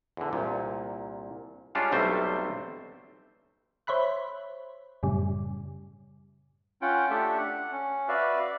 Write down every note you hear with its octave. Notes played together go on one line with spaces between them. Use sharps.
E2 D3
C2 A#2
G3 G#3 C#4 D4 F4
B1 C3 G3 A3 C4 C5
C5 C#5 E5 B5 F#6
F#2 A2 C#3 G3
C#4 F4 F#5 G5
A3 D4 G4 A4 E5
F#5
C#4
F#4 B4 D5 E5 F5